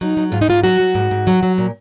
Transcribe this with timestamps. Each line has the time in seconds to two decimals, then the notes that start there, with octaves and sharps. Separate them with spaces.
0.01 F#3 D#4
0.17 F#3
0.32 G#2 F4
0.41 D#4
0.48 G#2 F4
0.64 F#3 F#4
0.80 F#3
0.95 G#2
1.11 G#2
1.27 F#3
1.43 F#3
1.58 A#2